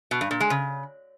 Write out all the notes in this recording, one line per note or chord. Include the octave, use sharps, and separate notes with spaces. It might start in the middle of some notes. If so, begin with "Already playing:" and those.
B2
G2
A#2
G#3
C#3